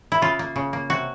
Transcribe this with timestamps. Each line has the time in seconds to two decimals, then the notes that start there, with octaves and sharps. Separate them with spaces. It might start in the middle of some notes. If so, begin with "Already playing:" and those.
0.12 E4
0.22 C#3 F4
0.39 A#3
0.56 C#3
0.73 A#3
0.90 C3 F#4